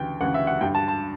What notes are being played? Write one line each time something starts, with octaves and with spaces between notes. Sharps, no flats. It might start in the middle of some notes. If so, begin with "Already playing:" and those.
Already playing: D2 C#3 E3 G5
D2 C#3 E3 F#5
E5
F#5
G2 D3 G5
A5
A5